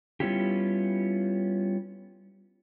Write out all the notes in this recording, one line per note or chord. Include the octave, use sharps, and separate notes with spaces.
G3 B3 C#4 E4 F4 G4